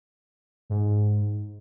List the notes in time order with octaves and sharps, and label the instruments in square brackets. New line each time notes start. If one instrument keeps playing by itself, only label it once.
[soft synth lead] G#2